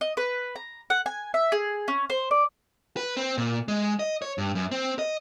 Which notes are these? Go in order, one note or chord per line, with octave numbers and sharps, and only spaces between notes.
D#5
B4
A#5
F#5
G#5
E5
G#4
C#4
C5
D5
B4
C4
A#2
G#3
D#5
C#5
G2
F#2
C4
D#5